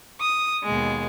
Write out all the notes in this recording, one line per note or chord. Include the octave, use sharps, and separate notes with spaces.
D#6
D#2 B2 G#3